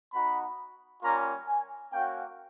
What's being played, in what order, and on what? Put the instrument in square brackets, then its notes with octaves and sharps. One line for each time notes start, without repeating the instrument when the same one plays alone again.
[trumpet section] B3 D#4 F#4 B5
G3 A#3 C#4 F4 A#5
G#5
A#3 C#4 F#4 G5